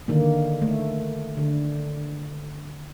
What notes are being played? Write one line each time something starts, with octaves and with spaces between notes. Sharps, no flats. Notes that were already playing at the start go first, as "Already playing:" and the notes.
D3 D#3 A#3
A3
D3